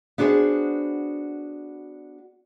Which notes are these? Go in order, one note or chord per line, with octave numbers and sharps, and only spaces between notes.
B3 D4 F#4 G#4 C5